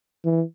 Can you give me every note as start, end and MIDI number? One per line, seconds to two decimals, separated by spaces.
0.25 0.43 52